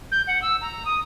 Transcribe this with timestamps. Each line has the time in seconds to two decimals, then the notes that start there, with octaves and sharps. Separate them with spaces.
0.12 G6
0.27 F#5
0.42 E6
0.61 A#5
0.85 D#6